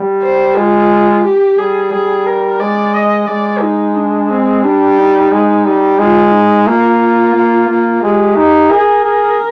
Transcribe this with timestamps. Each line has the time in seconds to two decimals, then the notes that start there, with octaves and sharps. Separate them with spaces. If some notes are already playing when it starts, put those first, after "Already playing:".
Already playing: G3
0.23 C5
0.56 G#3 F4
1.25 G4
1.58 G3 G#4
1.92 G3 G#4
2.26 A#4
2.60 G#3 D5
2.95 D#5
3.28 G#3 D5
3.62 D#4
3.95 D4
4.30 C4
4.63 G3 D4
4.98 D#4
5.31 G#3
5.65 G3
5.99 G#3 F4
6.33 D#4
6.66 A#3 F4
7.34 A#3
7.69 A#3
8.02 G#3 G4
8.36 D#4
8.70 G#4 A#4
9.04 G#4